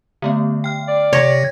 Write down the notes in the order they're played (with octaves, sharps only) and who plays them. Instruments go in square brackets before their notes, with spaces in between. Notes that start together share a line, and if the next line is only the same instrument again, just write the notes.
[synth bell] D3 A3 B3
G5 F6
[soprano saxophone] D5
[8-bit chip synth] C3 G#6 A#6 [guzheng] C#5